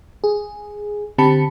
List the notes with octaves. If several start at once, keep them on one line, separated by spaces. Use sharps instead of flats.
G#4
D3 C4 G4 A5 B5 C#7